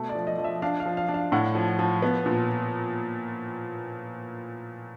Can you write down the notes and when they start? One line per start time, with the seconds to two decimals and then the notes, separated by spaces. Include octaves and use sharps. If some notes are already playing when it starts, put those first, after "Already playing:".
Already playing: B2 A3
0.09 D5
0.15 F3
0.27 D#5
0.38 F3
0.44 E5
0.62 D4 F5
0.80 F5
0.86 F3
0.97 F5
1.08 D4
1.14 F5
1.32 A2 F#5
1.55 F3
1.79 F3
2.02 B3
2.26 A#2